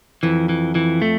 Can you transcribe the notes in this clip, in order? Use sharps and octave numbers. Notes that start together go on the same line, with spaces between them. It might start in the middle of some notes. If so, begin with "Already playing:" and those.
F2 E3
E3
E3
A3